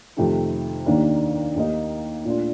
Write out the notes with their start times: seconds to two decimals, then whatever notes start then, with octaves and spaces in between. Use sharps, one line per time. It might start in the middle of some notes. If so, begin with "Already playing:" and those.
0.17 F2 C3 D#3 A3
0.86 D#2 D#3 A#3 D4
1.56 D#2 D#3 A#3 D#4
2.25 A#2 A3 D4 F4